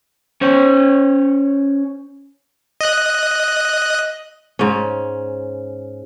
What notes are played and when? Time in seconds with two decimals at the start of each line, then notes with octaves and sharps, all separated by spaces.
0.41 C#4 C5 C#5
2.81 D#5 F#6
4.59 G#2 C#4